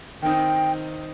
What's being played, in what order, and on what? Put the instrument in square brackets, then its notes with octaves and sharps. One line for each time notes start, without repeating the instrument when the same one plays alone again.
[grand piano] D#3 C4 D#4 [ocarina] G5